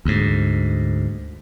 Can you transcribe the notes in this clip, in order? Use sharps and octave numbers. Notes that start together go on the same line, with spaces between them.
D2 G#2